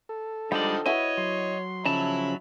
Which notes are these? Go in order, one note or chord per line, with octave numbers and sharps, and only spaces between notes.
A4
D3 F3 G3 G#3 D#4 D5 G5
E4 F#4 B4 C#5 D#5
F#3 C6
C#3 F3 F#3 C#4 D#4 E5 A5 B5